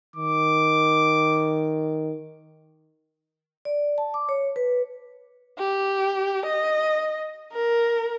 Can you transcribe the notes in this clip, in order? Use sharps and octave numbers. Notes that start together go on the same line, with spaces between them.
D#3 D6
D5
A5
D6
C#5
B4
G4
D#5
A#4